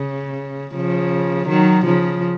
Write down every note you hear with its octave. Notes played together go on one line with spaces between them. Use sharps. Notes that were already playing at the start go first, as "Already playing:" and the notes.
Already playing: C#3
C#3 F3
D#3 F#3
C#3 F3